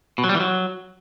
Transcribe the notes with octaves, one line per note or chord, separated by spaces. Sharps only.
B2
F#3
G3
E3
F#3